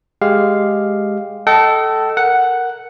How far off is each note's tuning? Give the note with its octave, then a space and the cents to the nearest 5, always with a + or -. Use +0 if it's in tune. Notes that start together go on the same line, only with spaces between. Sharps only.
G#3 +0 G4 +0 F5 +0
A4 +0 D#5 +0 G5 -45
A#4 +0 F#5 +0